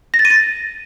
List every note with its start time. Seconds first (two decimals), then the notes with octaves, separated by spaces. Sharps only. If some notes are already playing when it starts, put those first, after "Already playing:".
0.14 A#6
0.19 A6
0.25 D#7
0.30 A6